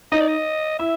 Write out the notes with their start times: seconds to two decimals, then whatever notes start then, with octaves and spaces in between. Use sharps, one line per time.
0.12 D#4 D#5
0.20 D5
0.28 D#5
0.79 E4 E5